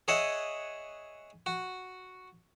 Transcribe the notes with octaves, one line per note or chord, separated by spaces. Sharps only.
G#4 C#5 D#5 E5 F#5
F#4